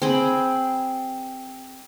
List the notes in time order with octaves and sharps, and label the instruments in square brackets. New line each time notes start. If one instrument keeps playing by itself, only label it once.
[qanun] C4 G#4 G5 B5